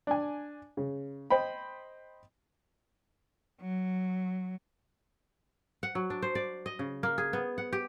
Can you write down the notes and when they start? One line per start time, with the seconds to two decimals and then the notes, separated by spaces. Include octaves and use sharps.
0.07 D4 G#5
0.77 C#3
1.30 C5 D#5 G5 B5
3.61 F#3
5.83 F#5
5.95 F#3
6.10 D4
6.22 C5
6.35 D5
6.66 D#5
6.79 C#3
7.03 A#3
7.18 G#4
7.33 B3
7.58 F#5
7.73 G4